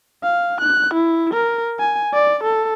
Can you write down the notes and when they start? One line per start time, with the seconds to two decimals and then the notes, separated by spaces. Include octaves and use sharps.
0.23 F5
0.61 F#6
0.94 E4
1.34 A#4
1.80 G#5
2.14 D5
2.43 A4